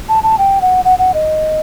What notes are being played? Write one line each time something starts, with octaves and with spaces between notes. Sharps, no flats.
A5
A5
G5
F#5
F#5
F#5
D#5